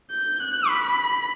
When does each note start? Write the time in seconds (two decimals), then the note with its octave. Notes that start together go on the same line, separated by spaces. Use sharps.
0.11 G6
0.40 F#6
0.69 B5